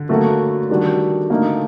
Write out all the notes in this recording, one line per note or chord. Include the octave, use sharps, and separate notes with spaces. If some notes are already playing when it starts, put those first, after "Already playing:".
Already playing: D3
F#3 A3 A#3 F#4
D#3 G3 D4 F#4
D3 A3 A#3 D#4